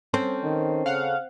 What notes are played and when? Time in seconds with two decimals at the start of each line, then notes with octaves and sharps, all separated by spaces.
0.14 C4 C#4 A4 C5
0.43 D#3
0.86 C#3 F5 F#5